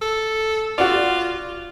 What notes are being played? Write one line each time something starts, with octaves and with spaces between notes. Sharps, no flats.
A4
F4 F#4 D5